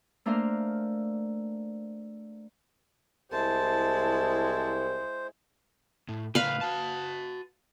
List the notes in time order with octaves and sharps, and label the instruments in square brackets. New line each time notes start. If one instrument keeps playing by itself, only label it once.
[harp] A3 A#3 D4 A#4 C5 F5
[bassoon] C2 [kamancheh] G#3 E4 [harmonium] C5 [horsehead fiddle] A5
[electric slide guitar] A2
[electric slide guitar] A2 C#3 A#4 [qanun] B4 F5
[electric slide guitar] F#4 A5